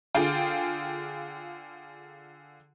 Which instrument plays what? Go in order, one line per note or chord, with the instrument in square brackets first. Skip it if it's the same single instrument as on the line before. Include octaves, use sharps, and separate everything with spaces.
[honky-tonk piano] D3 F4 G#4 F5 G5